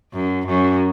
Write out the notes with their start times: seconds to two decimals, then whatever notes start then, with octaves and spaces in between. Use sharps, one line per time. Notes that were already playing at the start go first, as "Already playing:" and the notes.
0.13 F#2
0.47 F#2